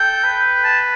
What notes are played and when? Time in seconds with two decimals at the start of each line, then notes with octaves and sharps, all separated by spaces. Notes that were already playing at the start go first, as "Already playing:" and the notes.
Already playing: A4 G5
0.24 B4
0.64 A5